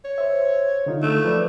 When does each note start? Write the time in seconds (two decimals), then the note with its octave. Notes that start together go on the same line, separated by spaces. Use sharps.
0.04 C#5
0.18 C5 E5
0.86 D3 D#4 F4
1.02 A3
1.25 F3 B4 D5